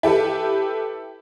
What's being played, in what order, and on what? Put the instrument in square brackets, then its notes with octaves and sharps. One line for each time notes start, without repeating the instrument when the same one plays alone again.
[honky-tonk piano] E4 G4 A4 B4